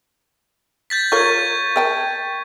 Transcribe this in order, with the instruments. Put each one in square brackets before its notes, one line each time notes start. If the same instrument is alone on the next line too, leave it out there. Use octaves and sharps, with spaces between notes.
[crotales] G6 A6 B6
[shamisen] F4 A#4 C#5 [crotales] C#6 G#6
[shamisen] A#4 G5 A5